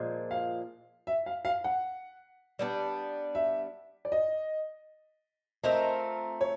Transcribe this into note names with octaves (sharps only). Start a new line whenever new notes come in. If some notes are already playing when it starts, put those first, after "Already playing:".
Already playing: A#2 F3 G#3
F5
E5
F5
F5
F#5
G3 B3 D4
E5
D5
D#5
A3 C4 F4 A#4 D#5
C#5